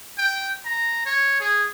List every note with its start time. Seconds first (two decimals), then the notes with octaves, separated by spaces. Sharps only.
0.18 G5
0.65 A#5
1.06 C#5
1.40 G#4